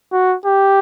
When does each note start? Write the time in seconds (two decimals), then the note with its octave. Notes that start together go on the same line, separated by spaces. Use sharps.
0.12 F#4
0.46 G4